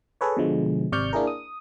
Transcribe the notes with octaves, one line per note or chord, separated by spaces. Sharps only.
G#4 A4 B4 C#5
B2 D3 F3 G#3
G#1 C3 D5 C#6 F6 G6
A#3 D4 E4 G#4 A#4
D#6